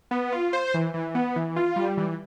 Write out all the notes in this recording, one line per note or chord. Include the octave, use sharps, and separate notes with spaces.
B3
F4
C5
E3
E3
B3
E3
F4
G3
E3